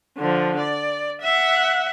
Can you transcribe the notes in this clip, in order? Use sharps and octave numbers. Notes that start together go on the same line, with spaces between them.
D3 F3
D5
E5 F#5